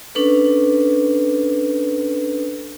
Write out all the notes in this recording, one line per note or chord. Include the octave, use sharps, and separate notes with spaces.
C#4 D4 A4 B4